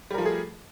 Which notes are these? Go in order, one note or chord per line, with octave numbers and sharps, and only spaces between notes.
F3 G3 A3 G#4 A#4